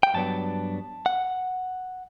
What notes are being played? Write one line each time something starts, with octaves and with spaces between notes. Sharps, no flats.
G5
G2 F#3 B3 D4 A5
F#5